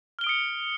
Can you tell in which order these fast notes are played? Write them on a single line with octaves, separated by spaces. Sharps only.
F6 G7 D7 D#6 C#7